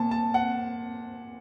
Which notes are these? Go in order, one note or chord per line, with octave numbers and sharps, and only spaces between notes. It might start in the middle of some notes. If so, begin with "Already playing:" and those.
Already playing: A#2 A5
A5
F#5